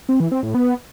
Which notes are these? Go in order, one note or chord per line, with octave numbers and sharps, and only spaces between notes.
C4
E3
C4
A2
B3